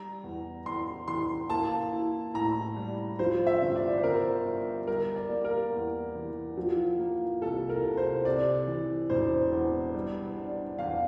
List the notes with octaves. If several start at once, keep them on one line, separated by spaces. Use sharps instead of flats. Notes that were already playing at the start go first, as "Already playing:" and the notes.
Already playing: G3 A#5
E2
E2 C6
E3 C6
A#3 A5
E4
A2 A#5
G3
F3 C5
E5
G1
D5
C5
G1 A#4
G2
G3 A#4
D5
A#3
A#4
E2
E3
F3
A#3
C2 A4
A#4
C3
C5
C3 D5
E3
E1 C5
E2
G3
D4
E2 F5